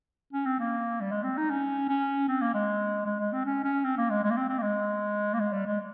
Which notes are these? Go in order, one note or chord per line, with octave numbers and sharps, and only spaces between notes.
C#4
C4
A#3
G3
G#3
C4
D#4
C#4
C#4
C4
A#3
G#3
G#3
G#3
C4
C#4
C#4
C4
A#3
G#3
G#3
A#3
C4
C4
A#3
G#3
A#3
G#3
G3
G#3